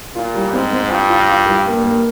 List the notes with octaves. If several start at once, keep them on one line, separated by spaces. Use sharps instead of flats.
A#2 F4
G3
G#2 C4
C4
G2 F4
F4
F4
G3
G2 A#3
A#3